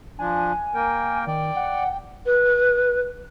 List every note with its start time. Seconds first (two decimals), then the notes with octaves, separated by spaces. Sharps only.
0.19 F3 D4 G#5
0.74 A#3 A#4 G5
1.27 D#3 D5 G5
1.56 F#5
2.26 B4